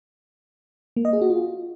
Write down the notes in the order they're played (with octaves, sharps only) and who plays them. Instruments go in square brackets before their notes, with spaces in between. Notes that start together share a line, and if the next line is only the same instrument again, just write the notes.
[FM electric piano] A#3
D#5
G#4
F#4
F4